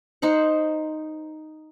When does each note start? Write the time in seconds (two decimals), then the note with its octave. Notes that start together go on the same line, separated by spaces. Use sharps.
0.22 D#4 C5 F#5